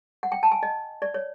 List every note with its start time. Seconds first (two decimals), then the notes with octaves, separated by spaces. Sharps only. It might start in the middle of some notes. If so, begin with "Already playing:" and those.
0.23 F#5
0.32 G5
0.43 A5
0.52 G#5
0.63 D#5
1.02 D5
1.14 C#5